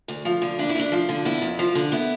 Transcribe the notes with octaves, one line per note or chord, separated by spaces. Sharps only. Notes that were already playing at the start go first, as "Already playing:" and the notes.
D2
F3
D3
D2 D4
E4
D2 D4
F3
D3
B3 E4
F2
F3
D3
B3 E4